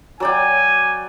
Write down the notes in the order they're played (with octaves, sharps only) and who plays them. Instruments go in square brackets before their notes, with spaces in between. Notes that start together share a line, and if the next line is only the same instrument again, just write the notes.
[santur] F#3 D5 G5 [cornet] G#5